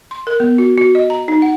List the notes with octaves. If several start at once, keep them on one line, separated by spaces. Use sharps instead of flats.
C6
A#4
B3
F#4
F#4
D#5
A#5
D#4
F#5